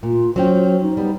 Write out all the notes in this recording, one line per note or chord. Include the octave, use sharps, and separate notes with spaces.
A#2 F4
F#3 C#4 C5 G5
D#4
G3 B3